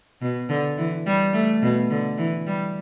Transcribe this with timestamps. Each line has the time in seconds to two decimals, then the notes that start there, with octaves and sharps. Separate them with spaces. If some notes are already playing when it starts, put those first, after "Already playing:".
0.21 B2
0.49 D3
0.77 E3
1.06 G3
1.33 A3
1.62 B2
1.90 D3
2.18 E3
2.47 G3